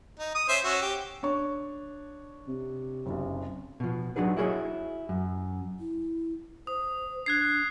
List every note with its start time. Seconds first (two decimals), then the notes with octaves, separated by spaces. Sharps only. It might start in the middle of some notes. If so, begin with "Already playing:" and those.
0.19 D#4
0.35 D#6
0.49 C#4 C5 E5
0.65 C#4 F#4 E6
0.82 G4
1.23 D4 C#5 C#6
2.48 C3
3.06 F#1 B1
3.80 B2 F3
4.16 F#3 D4 D#4 F#4 G#4 B4
4.37 E4 F#4 G#4 A#4 C#5 D#5
5.09 F#2
5.79 E4
6.67 C5 D#6
7.26 D4 F#6 G#6 C7